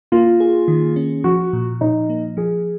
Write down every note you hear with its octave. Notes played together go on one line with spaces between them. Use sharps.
A#3 F4
G#4
D#3
C#4
F3 F#4
A#2
A#2 D#4
A#3
F3 G#4